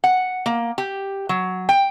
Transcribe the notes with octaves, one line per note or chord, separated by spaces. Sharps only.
F#5
A#3
G4
F#3
G5